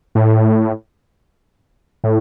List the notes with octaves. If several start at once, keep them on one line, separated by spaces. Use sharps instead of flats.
A2
A2